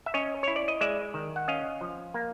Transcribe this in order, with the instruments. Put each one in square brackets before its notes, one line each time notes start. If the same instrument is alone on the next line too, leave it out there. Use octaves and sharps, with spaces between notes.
[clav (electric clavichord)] E5
C#4 C#5 D#5
E4 C#5
D5
D#5
G#3 D5 E5
D#3
F#5
C#4 D#5 F5
F3
A#3